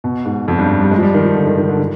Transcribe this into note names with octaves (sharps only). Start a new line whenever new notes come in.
B2
G#2
F2
G2
G3
G#3
F3
G3
D#3
F3
D3
D#3
D#3
D3
D#3